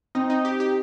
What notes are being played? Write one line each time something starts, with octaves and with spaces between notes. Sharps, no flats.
C4 D#4
D#4
G4
G4